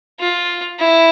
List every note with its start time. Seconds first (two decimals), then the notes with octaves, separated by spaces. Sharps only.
0.20 F4
0.79 E4